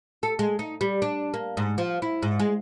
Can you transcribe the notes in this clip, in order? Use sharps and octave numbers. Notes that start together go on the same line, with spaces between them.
A4
G#3
D#4
G3
D4
A#3
G#2
F3
E4
G#2
G#3